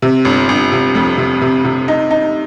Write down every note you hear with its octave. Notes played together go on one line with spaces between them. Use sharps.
C3
G1
G1
C3
F2
C3
C3
C3
D#4
D#4